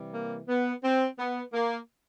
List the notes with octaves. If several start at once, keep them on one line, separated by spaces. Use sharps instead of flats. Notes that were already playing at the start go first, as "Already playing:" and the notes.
Already playing: C3 E3 G3
A#3
B3
C4
B3
A#3